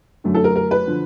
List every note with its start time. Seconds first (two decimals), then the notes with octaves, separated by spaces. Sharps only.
0.24 F#2 D3 F#3 A3
0.34 A4
0.44 A#4
0.56 A#4
0.71 B4
0.87 D3 F3